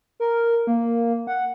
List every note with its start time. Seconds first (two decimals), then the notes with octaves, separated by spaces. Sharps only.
0.20 A#4
0.67 A#3
1.27 F#5